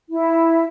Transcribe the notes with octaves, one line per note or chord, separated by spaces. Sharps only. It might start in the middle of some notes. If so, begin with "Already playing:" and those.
E4